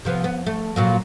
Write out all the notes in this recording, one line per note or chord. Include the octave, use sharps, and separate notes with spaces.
C3 F3 B3
B3
A3
A#2 F#3 A#3